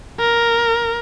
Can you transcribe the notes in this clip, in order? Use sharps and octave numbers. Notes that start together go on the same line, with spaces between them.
A#4